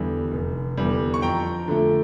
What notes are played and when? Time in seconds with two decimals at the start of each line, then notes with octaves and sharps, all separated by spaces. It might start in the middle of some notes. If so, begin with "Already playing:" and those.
Already playing: E2 D3 G3
0.31 F1
0.77 E2 D3 G3
1.14 C#6
1.22 F2 G5 A#5
1.68 D3 F3 A3